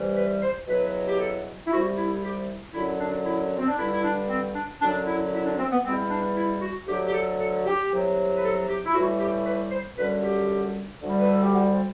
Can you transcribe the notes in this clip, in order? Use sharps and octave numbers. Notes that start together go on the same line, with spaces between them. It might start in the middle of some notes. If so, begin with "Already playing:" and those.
Already playing: C2 C3 E3 G3
B4
C5
E2 B2 F#3 B4
G4
A4
E4
C2 C3 G3 F#4
E4
G4
F#2 D3 F#3 E4
D4
E4
C4
D4
G2 D3 G3 E4
E4
D4
C4
D4
F#2 D3 F#3 D4
E4
E4
D4
C4
B3
E2 B2 G3 C4
D4
E4
F#4
D2 D3 F#3 G4
G4
A4
A4
G4
C2 C3 F#3
B4
A4
G4
E4
A2 E3 G3 F#4
G4
B4
C5
F#2 D3 G3 B4
G4
D2 D3 G3
B4
A4
G4
F#4
C4